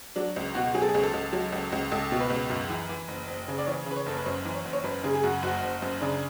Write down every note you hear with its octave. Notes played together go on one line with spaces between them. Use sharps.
F#3 D4
C#2
B2 F#4
F#3 G#4
A4
G#4
C#2
A4
C#2
F#3
C#2
C#2
C#2 A4
B2
B4
C#2
F#2
E3
E3
F#1
F#1
C#3
D5
E3 C#5
C#3
B4
C#5
F#1 A4
B4
F#2 C#5
E3
C#5
F#1
C#5
F#2 B4
C#3 G#4
G#4
F#2 F#4
F#1 F#4
F#1
F#2
C#3 D4